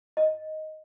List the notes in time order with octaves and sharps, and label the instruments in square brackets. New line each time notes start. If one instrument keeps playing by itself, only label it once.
[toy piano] D#5